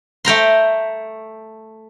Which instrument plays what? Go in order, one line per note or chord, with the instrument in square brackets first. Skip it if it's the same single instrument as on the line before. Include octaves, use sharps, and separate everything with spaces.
[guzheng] A3 G5 A#5 C6